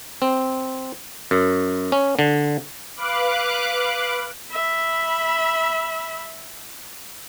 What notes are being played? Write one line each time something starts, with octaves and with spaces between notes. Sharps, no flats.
C4
F#2
C#4
D3
B4 F5 D6 F#6
E5 B5